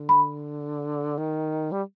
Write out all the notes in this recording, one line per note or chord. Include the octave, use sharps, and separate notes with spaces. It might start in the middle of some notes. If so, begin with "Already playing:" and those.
Already playing: D3
B5
D#3
G3